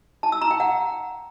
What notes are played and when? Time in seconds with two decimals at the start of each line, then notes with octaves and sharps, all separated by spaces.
0.23 A5
0.32 E6
0.42 A#5
0.51 G5
0.60 F#5